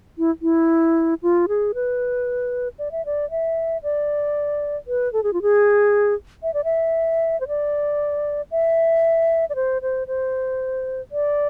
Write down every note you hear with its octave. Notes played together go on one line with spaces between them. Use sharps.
E4
E4
F4
G#4
B4
D5
E5
D5
E5
D5
B4
A4
G#4
F4
G#4
E5
D5
E5
C5
D5
E5
D5
C5
C5
C5
D5